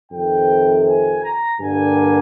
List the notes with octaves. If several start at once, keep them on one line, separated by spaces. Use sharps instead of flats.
F2 C3 D#3 G5
G#5
A#5
G2 D3 G3 A#3 G#5